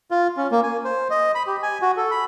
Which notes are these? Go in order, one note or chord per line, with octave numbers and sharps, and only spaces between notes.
F4
C#4
A#3
G#5
C5
D#5
B5
G4
G#5
F#4
A4
B5